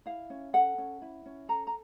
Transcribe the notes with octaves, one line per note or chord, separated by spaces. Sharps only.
E4 F5
C#4
A4 F#5
C#4
E4
C#4
A4 A#5
A#5